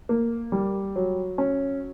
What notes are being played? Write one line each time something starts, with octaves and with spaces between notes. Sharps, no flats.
A#3
G3
F#3
C#4